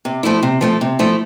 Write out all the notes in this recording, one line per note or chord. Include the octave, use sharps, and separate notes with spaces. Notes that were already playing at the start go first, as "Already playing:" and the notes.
C3
F3 A3 E4
C3
F3 A3 E4
C3
F3 A3 E4